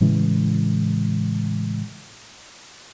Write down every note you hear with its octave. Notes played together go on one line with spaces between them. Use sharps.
A2 C#3 E3 G#3